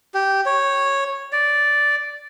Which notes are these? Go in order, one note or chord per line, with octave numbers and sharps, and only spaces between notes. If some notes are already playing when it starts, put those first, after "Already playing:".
G4
C#5
D5